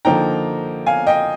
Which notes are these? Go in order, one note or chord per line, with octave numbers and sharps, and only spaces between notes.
D3 F3 A#3 D#4 G5 A#5
F5 G#5
D#5 G5